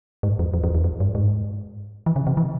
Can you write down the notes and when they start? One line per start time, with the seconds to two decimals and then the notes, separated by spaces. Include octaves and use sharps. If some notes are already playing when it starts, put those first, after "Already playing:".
0.23 G#2
0.39 F2
0.54 F2
0.64 F2
0.75 E2
0.84 F2
1.00 G2
1.15 G#2
2.06 E3
2.16 C#3
2.27 C3
2.37 E3